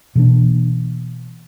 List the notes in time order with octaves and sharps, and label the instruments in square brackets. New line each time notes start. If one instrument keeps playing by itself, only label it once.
[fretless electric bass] B2 E3 A#3 D4